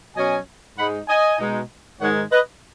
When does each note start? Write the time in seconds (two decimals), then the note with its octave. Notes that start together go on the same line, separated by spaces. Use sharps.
0.16 B2 F#3 C#4 D#5 G#5
0.77 G#2 G#3 D#4 F#5 B5
1.08 D#5 G#5
1.38 B2 G#3 D#4
2.00 G#2 D#3 G#3 D#4 C#5 F#5
2.31 B4 D#5